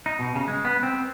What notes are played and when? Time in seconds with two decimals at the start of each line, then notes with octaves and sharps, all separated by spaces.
0.06 D#4
0.19 B2
0.35 C#3
0.48 G#3
0.65 B3
0.83 C4